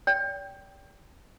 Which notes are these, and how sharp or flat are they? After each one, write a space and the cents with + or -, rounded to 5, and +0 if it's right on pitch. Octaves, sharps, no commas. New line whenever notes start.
D5 -45 G5 -5